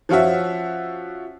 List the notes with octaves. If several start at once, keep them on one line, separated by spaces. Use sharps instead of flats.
F3 C#4 F4 F#4 E5